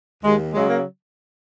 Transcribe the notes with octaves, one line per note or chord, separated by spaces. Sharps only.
D#2 G#3
C#3 F#3 G#3
A#3